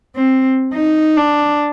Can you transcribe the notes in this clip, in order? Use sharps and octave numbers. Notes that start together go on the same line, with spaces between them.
C4
D#4
D4